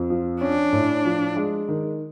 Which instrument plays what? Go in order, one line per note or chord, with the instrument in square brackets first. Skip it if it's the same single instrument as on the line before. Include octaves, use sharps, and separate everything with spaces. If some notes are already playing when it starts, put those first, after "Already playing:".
Already playing: [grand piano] F2
F3
[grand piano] C#4 [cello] D4
[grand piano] A2
F3
G#3
D#3